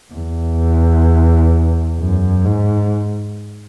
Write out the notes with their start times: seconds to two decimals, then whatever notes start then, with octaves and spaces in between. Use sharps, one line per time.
0.14 E2
1.99 F#2
2.45 G#2